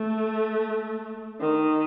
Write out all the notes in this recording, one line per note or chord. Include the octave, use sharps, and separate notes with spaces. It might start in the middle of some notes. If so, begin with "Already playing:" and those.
Already playing: A3
D#3